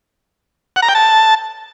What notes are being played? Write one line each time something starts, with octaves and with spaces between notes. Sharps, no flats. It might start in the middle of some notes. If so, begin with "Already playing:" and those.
F#5
A#5
G5
A5